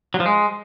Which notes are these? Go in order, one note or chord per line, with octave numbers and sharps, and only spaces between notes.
F#3
F3
G#3